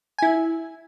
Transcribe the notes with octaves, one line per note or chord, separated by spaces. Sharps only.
E4 G#5